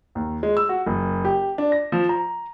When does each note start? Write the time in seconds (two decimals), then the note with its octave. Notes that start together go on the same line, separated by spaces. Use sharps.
0.15 D#2
0.43 G#3
0.57 E6
0.69 F#4
0.87 F#1
1.25 G4
1.58 D4
1.72 A#6
1.92 F3
2.09 A#5